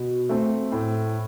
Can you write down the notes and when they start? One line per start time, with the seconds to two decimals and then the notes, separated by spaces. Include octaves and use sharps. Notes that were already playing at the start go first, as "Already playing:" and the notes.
Already playing: B2
0.29 A3 C4
0.72 A2